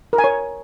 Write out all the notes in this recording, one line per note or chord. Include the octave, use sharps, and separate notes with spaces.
A#4
G#5
C#5